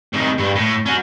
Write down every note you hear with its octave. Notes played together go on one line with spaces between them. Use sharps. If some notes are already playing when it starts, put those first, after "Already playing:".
C2 D#3
G2
A2
C#4 F#4